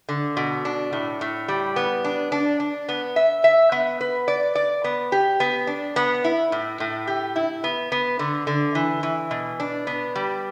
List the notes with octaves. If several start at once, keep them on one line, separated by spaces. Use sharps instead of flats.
D3
B2
D4
A2
A2
G3
B3
D4
D4
D4
B3
E5
E5
B3
B4
D5
D5
B3
G4
B3
D4
B3
E4
A2
A2
G4
E4
B3
B3
D3
D3
E3
E3
B2
D4
B3
G3